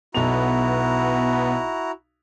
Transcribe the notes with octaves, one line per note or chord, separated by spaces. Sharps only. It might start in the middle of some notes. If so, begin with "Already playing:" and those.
B1 B3 E4 F#4 A#5 F7